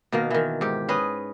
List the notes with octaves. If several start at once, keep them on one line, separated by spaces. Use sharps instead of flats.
B2 D#3 A#3
D#3 E3
G#2 G4
C#4 G#4 B4 D#5